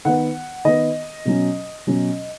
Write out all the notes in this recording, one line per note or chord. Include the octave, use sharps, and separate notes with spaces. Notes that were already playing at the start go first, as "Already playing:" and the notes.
D#3 B3 F#5
D#3 B3 D#5
B2 F#3 C#4
B2 F#3 C#4